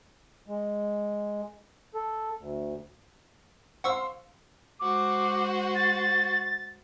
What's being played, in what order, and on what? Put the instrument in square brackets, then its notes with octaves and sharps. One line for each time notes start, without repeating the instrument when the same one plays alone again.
[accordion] G#3
A4
D2
[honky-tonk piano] C5 F5 C6 [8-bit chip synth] F#5 C#6 E6
[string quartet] G#3 F#4 C5 [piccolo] D6
[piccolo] A6